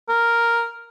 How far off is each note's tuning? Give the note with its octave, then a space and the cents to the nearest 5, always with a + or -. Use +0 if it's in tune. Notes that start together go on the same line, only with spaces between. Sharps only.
A#4 +0